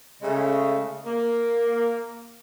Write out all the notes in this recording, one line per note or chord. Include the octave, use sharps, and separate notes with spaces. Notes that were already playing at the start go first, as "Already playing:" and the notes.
C#3 G#3 A3
A#3